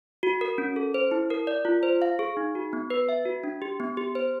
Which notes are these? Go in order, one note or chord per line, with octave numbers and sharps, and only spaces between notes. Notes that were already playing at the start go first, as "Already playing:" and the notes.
F#4
A#4
C#4
A4
C5
E4
A#4
D5
F4
C5
F5
G#4
D#4
F#4
B3
B4
E5
F#4
D4
G4
B3
G4
C5